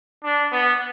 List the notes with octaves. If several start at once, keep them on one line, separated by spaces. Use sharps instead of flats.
D4
B3